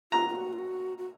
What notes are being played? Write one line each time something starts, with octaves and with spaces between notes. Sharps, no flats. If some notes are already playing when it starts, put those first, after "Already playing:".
F4 A#5
F4
F#4
F4
F#4
F#4